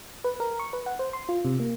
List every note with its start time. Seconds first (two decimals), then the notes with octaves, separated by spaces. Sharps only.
0.24 B4
0.40 A#4
0.59 C#6
0.73 B4
0.86 F#5
0.99 C5
1.13 C6
1.29 F4
1.45 C3
1.60 A#3